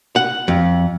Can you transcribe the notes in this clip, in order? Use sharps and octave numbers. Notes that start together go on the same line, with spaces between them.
F#5
F2